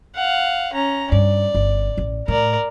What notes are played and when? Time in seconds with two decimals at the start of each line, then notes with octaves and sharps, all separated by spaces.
0.16 F5 F#5
0.74 C#4 A#5
1.12 G2 D5
1.55 G1
1.97 A1
2.28 A2 A#4 D5